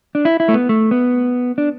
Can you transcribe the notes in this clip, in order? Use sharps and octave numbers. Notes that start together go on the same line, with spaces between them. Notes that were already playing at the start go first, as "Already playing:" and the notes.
D4
E4
E4
A3
B3
A3
B3
D4